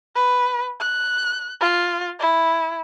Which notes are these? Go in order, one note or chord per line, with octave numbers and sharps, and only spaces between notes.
B4
F#6
F4
E4